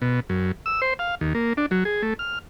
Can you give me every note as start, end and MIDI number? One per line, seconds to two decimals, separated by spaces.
0.02 0.20 47
0.29 0.52 42
0.66 0.81 88
0.82 0.94 72
0.99 1.15 77
1.21 1.33 39
1.35 1.53 58
1.57 1.66 62
1.71 1.84 54
1.85 2.02 68
2.02 2.14 57
2.19 2.39 89